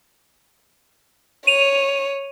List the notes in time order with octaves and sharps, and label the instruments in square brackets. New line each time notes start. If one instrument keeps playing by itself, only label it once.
[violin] C#5 [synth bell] D#7 F7